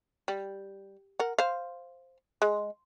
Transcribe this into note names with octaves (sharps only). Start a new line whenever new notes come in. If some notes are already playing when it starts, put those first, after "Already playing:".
G3
A#4 F#5
C5 F5
G#3